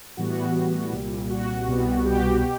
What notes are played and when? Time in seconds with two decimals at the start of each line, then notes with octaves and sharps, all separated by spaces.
0.17 A2 E3 G3 B3 F#4
0.92 C2 A#2 G3
1.30 F#4
1.67 C2 B2 G3 B3
2.05 G4
2.42 B2